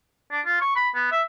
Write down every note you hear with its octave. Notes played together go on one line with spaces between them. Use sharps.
D4
F4
C#6
B5
B3
E5